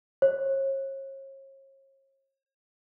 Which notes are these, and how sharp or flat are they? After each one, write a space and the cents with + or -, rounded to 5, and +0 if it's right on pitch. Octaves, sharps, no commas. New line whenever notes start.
C#5 -40